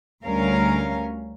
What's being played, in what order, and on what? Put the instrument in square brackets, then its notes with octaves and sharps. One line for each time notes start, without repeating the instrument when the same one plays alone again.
[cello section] D2 G3 C#4 A#4 F5